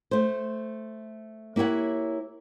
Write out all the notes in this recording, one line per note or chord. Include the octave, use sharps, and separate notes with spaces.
A3 C5
A#3 E4 G4 C#5 F#5